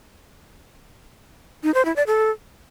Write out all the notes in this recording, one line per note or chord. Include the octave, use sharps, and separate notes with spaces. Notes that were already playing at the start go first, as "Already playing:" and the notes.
D#4
C5
E4
D5
A4